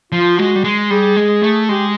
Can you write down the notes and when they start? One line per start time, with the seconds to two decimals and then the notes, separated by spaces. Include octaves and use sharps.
0.12 F3 F4
0.38 G#3 F#4
0.56 G3
0.64 G#3
0.91 G3 G#4
1.17 G#3
1.43 A3
1.68 G#3 G4